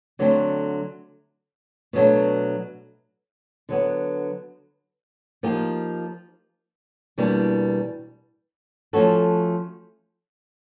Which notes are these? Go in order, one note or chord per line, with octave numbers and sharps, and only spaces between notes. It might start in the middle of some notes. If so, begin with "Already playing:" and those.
D3 F#3 A3 C4
B2 F#3 A3 D4
D3 F#3 B3
F3 A#3 D#4 G4
E2 B2 G3 A#3 D4
F3 A3 C#4 F#4 A4